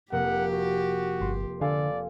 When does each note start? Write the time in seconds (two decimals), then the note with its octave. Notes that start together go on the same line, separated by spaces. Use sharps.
0.12 F1 A#3 G4 A#4 F#5
0.52 F#4
1.21 G1 C6
1.61 D3 A4 D5 F5 G#5